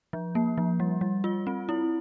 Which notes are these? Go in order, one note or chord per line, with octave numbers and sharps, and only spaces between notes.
F3
A#3
F3
G3
G3
F4
C4
E4